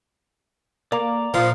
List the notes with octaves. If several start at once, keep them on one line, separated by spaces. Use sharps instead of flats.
A#3 D5 A#5 D6
A#2 F3 F4 F5 D#6